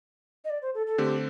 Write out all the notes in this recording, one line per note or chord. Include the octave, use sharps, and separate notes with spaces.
D#5
D5
C5
A4
A4
D3 A3 C4 G4